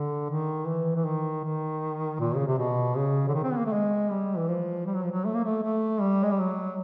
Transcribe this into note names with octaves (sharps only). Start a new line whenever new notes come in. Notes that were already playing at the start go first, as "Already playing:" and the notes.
Already playing: D3
D#3
E3
E3
D#3
D#3
A#2
C#3
C3
B2
C#3
D3
D#3
C4
B3
A#3
A3
G#3
G3
E3
F3
G3
F#3
F3
F#3
A3
A#3
A3
A3
G3
G#3
G3
F#3